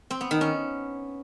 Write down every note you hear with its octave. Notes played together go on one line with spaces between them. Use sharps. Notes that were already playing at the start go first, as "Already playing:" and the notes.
C4
B3
D#3
C#4